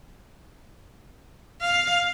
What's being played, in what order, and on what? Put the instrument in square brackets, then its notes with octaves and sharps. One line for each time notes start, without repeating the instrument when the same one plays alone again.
[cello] F5